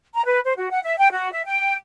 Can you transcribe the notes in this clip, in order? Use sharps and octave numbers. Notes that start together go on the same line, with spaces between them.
A#5
B4
C5
F#4
F#5
E5
G5
F#4
E5
G5